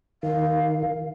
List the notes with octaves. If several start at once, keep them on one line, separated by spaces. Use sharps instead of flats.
D#3 F5